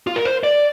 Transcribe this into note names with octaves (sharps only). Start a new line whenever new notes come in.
F4
A#4
C5
D5